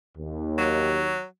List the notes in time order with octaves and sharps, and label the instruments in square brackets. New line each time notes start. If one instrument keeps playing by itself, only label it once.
[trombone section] D#2
[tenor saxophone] F#3